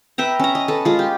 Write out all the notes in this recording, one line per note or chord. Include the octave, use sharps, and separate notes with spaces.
B4 E5 G5 A#5
C#4 A#5
D#5
A4 B4
G#3 F4
G4